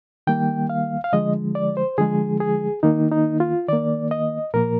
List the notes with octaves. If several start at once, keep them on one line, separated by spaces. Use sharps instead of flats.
D#3 G3 A#3 G5
F5
F5
D3 F3 G#3 D#5
D5
C5
D3 F3 G#3 G#4
G#4
D#3 A#3 D#4
D#4
F4
D#3 A#3 D5
D#5
A#2 F3 A#3 A#4